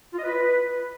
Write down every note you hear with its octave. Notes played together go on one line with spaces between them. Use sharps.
F4
D#5
B4